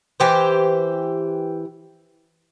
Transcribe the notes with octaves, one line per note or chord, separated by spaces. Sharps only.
E3 G4 C5